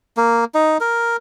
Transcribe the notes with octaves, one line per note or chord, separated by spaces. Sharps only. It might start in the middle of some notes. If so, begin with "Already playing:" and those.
A#3
D#4
A#4